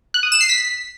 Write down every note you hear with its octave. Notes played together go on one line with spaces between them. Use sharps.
F#6
D#6
E7
C7
B6